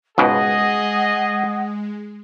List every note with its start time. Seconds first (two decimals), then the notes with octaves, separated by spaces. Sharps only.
0.18 C#2 G#2 B2 G#3 G#4 D#5 F#5